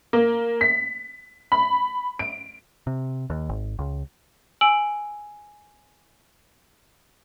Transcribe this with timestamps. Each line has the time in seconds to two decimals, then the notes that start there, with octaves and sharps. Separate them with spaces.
0.13 A#3
0.61 B6
1.52 B5
2.19 D7
2.87 C3
3.30 D#2
3.49 G#1
3.79 C#2
4.61 G#5 E6 D7 F#7